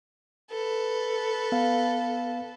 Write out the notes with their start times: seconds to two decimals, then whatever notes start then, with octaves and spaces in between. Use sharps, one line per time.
0.51 A4 B4
1.52 B3 F5